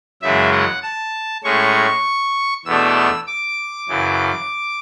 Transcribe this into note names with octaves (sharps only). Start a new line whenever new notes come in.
F#2 C#3 E3 G#3 E5
F#5
A5
A2 G#3 C#4 C#6
E2 B2 A3 D4 E6
D6
F#2 C#3 E3